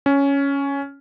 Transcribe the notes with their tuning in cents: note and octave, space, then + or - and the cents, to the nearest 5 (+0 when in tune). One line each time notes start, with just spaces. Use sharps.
C#4 +5